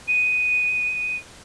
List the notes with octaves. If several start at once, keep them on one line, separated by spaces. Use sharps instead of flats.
D#7